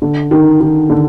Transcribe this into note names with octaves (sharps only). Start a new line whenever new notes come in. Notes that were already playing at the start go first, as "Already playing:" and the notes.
D3
D#3
D#3
D3